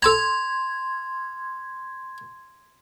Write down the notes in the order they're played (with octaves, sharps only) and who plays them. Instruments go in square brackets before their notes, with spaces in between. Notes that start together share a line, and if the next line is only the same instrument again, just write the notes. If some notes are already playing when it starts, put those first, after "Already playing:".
[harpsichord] A4 A5 A#5 [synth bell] C6 G#6